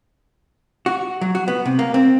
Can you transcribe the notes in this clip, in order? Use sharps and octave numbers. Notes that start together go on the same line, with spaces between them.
F#4
F#3
F#4
B3
C3
A#3
C4